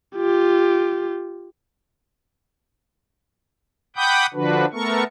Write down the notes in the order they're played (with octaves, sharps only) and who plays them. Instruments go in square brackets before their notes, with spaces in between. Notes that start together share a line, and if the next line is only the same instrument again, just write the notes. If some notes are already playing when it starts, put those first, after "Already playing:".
[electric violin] F4 G4
[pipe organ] F#5 G5 B5 D6 D#6 G6
D3 F3 D4 F#4 B4
A3 B3 A4 A#4 C#6